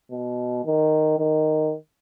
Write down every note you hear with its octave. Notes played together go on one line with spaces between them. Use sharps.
B2
D#3
D#3